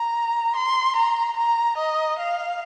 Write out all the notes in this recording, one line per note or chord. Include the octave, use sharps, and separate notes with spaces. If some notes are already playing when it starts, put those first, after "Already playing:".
Already playing: A#5
C6
A#5
A#5
D#5
F5